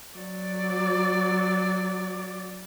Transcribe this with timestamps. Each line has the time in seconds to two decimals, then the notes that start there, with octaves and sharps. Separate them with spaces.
0.18 F#3 D5